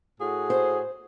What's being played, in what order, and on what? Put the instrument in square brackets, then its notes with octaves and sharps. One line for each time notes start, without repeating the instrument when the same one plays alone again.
[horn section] A2 F#4 G#4
[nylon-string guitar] C5